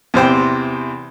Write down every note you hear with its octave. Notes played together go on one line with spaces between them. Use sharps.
E2 C3 C5 G5